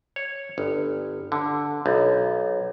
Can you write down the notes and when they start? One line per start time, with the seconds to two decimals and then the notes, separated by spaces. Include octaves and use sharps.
0.16 C#5
0.58 G1
1.32 D3
1.86 B1